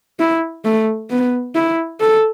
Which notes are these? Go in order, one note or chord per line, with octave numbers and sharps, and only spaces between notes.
E4
A3
B3
E4
A4